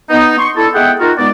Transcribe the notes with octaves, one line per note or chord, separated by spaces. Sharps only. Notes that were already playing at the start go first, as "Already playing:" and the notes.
B3 D#4
C6 C#6
D4 E4 A4
G#3 B3 G#4 E5 F#5 G5
D#4 F4 F#4 A#4
G2 G#3 B3 D#4 D5